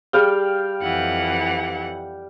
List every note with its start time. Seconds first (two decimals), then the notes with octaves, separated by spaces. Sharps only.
0.13 G3 G#4 F5 G5
0.82 F2 E3 F#5